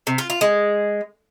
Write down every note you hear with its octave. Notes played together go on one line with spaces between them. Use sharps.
C3
F4
F4
G#3